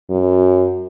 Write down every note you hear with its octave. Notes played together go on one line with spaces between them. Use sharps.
F#2